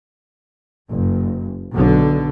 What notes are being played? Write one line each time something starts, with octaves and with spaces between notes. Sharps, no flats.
F#1
B1 D3